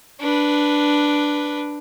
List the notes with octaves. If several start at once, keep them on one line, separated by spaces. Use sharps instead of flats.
D4 B4